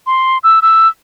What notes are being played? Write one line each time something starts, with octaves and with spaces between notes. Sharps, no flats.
C6
E6
E6